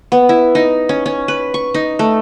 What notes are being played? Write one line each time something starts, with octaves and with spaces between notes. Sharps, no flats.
B3
E4
D#4
C#4
C#4
B4
C#6
D#4
A3